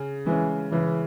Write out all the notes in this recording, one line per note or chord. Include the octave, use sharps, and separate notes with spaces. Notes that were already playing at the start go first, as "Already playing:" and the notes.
Already playing: C#3
E3 G#3 C#4
C#3 E3